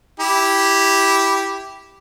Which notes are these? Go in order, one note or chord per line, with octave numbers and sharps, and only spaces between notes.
E4 G4